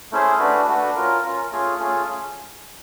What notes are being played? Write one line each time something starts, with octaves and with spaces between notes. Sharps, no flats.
A3 C#4 E4 G#4 C5
A3 D4 F#4 B4
A3 D4 F#4 B4
C#4 F4 A#4
C#4 F4 A#4
A3 C#4 F4 G#4
A3 C#4 F4 G#4